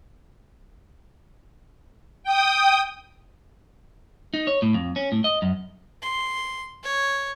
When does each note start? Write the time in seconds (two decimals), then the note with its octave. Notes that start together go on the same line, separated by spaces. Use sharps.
2.23 G5 D#6
4.34 D#4
4.47 C#5
4.62 A2
4.74 F2
4.96 C#4
5.12 A2
5.24 D#5
5.42 F#2
6.02 C6
6.83 C#5